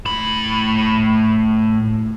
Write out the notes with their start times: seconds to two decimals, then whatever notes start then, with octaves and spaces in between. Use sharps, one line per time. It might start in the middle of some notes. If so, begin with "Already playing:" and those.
0.06 A2 B5